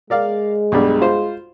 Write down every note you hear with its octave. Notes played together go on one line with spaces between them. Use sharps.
G#3 A#4 D5 F5
B1 G2 D5
F4 C5